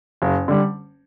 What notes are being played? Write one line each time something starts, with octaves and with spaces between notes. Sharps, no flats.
F#1
D3 G3